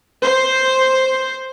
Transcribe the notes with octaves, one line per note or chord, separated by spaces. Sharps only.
C5